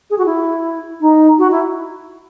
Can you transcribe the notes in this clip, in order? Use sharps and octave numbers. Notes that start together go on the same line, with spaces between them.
G#4
F#4
E4
D#4
F#4
E4